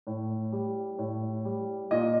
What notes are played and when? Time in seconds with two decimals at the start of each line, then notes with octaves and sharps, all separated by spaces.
0.07 A2
0.52 G3
0.98 A2
1.45 G3
1.91 A#2 D#5